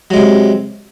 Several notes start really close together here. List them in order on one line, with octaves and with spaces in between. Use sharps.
F#3 G#3 C3